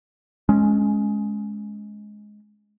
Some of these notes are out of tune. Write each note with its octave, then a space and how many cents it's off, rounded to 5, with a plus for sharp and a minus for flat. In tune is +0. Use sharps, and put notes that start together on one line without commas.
G#3 +15 C#4 +0